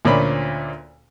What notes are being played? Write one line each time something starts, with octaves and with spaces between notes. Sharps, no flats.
D2 A#2 C#4 C5 D5 B5